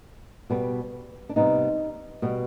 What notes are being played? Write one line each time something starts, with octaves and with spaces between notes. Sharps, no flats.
B2 G3 B3
D4
C3 G3 B3 D#4
B2 G3 B3